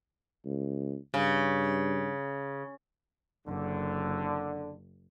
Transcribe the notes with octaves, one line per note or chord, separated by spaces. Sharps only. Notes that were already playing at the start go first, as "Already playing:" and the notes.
C#2
G2 C#3
F#1 D3